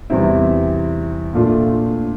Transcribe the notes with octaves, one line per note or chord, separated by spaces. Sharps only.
E2 C3 G3 C4 E4
A#2 A3 D4 F4